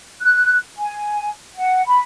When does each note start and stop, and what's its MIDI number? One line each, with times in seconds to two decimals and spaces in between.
0.21 0.56 90
0.77 1.29 80
1.56 1.83 78
1.87 1.99 83